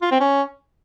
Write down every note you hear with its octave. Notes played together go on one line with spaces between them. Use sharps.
F4
C4
C#4